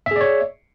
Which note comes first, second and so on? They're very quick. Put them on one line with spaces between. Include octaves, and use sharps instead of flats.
E5 G#4 D5 C#5